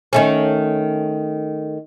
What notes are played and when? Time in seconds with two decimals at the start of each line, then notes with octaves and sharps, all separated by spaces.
0.13 D#3 A3 C#4